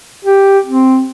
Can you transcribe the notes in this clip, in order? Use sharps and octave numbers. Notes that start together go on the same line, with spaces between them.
G4
C4